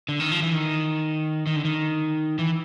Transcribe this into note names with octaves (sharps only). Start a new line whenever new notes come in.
D3
D#3
F3
E3
D#3
D#3
D3
D#3
E3